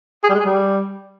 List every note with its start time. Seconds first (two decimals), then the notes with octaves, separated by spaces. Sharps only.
0.24 G#4
0.29 G3
0.34 G#3
0.40 G#4
0.45 G3